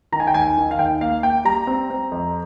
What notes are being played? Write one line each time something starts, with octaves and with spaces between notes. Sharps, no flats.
D#3 A#5
G#5
G5
D#2 G#5
D#3
F5
D#2 G5
A#3 F5
A#3 G5
G3 A#5
C4
C4
F2